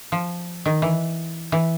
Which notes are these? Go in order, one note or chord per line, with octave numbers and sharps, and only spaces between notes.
F3
D#3
E3
E3